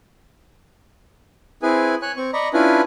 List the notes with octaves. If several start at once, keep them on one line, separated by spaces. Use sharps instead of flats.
C4 E4 G#4 B4 G#5
C#5 G#5 F#6
C4 C#6
D5 D#5 A#5 B5 C#6
C#4 D4 E4 F4 B4 G#5